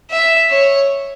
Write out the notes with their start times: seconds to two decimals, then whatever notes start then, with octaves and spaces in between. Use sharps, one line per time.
0.11 E5
0.51 C#5